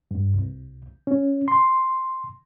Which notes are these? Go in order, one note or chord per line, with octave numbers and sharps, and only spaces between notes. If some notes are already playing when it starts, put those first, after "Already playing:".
G2
C2
C#4
C6